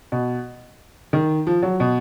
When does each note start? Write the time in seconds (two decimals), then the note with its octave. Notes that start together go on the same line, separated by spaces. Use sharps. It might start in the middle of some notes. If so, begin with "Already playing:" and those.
0.12 B2
1.13 D#3
1.47 F3
1.63 F#3
1.80 B2